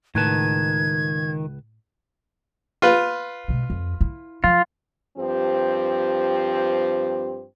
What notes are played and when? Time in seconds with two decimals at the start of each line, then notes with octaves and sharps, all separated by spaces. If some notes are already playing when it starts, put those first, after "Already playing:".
0.15 C#2 A2 D#3 B4 A5 G#6
2.82 F4 B4
3.48 B2 G#3
3.70 F2
4.01 E4
4.44 F3 F4
5.18 G2 F3 C4 G4